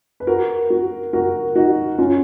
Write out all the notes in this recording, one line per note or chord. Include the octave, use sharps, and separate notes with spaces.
B4
F#4 A#4
F#4 A#4
F#4 A#4
D#4 F#4
C#4 F4